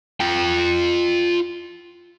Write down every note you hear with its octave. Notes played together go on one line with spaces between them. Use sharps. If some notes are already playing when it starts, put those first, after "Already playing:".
F4 G5